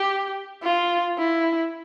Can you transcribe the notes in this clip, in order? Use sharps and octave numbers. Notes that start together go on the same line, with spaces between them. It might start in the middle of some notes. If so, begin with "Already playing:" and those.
Already playing: G4
F4
E4